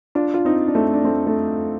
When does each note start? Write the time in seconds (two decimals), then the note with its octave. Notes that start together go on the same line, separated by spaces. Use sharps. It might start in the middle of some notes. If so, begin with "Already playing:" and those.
0.15 D4 F4
0.34 F4
0.45 C4 D#4
0.68 D4
0.75 A3 C4
0.94 D4
1.04 A3 C4
1.27 A3